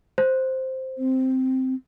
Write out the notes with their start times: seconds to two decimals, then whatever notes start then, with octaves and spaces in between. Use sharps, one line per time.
0.18 C5
0.98 C4